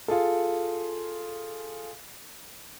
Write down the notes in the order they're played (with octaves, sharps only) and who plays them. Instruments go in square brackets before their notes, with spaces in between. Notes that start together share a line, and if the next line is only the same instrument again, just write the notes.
[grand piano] F4 G#4 A4